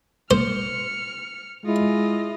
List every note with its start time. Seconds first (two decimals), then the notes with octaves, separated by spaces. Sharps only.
0.31 C5 F6 C#7
1.66 G#3 E4 F4 D#5